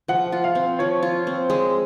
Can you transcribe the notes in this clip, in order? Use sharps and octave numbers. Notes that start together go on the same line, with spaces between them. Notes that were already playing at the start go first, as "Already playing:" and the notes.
F3 F#5
F4
F5
C4
F3 C#5
F4
C4
G#3